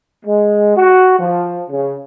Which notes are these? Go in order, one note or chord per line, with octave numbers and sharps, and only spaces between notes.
G#3
F#4
F3
C#3